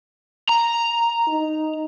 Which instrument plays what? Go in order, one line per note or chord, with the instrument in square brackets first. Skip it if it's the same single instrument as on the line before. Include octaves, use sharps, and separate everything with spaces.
[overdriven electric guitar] A#5
[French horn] D#4